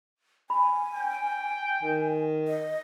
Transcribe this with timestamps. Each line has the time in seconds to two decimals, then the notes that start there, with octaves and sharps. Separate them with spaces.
0.50 G#5 B5
0.94 G5
1.83 D#3
2.48 D#5